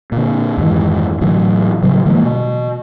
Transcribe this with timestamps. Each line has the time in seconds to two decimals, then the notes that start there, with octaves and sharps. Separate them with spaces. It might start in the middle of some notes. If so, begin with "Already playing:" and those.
0.12 A#2 D3
0.57 F2 G#2 D#3 E3
1.21 A2 D3 E3 F#3
1.83 A2 C#3 F#3 G3
2.06 D3 E3 G#3 A#3
2.24 B2